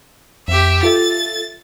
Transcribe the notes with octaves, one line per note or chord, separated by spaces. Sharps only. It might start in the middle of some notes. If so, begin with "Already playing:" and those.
F2 G4 E5
F4 A4 E5 A6